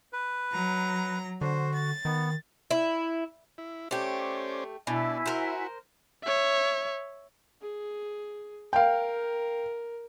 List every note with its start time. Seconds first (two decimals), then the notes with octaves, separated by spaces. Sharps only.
0.13 B4
0.52 F#3 A#5
1.41 D3 F#4 C5
1.74 A6
2.05 D#3 B3
2.71 E4
3.58 E4
3.91 A3 C#4 G4 C5 D5
4.87 B2 D4 E4 E5 G#5
5.26 F#4 A#4 C5
6.24 C#5 E5
7.62 G#4
8.73 A#4 F5 G5